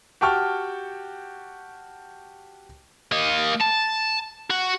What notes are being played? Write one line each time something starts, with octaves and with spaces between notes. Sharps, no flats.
F#4 G4 G5 A5 C#6 F6
A#3 D#5
A5
F#4